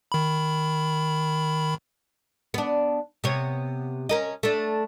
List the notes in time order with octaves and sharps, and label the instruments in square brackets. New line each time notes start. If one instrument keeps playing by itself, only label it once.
[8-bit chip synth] D#3 B5
[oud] B3 D4
C3 B3 C#5
C#4 A#4 D#5
A3 D4